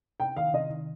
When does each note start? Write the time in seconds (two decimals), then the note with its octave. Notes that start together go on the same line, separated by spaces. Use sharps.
0.20 C3 G5
0.37 D#3 F5
0.53 C3 D#5
0.70 D#3